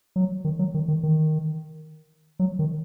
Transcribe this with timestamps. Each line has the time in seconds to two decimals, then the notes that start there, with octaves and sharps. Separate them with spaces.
0.16 F#3
0.45 D#3
0.59 F#3
0.74 D#3
0.88 D#3
1.03 D#3
2.39 F#3
2.59 D#3